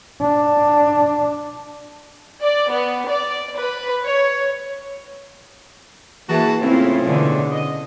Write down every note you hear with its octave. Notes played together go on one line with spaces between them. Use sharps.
D4
D5
B3
D5
B4
C#5
E3 A#3 F#4 G#4 A5
A2 C#3 C4 E4 F4 C5
B2 D3 E3
D#5